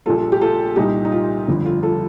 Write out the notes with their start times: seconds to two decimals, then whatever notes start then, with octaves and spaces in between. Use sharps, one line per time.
0.06 A#1 A#2 G3 F4 A4
0.32 G4
0.41 F4 A4
0.76 C2 A#2 G3 D#4 G4
1.05 D#4
1.12 F4
1.48 G1 F2 D3
1.66 F4
1.83 F4 A4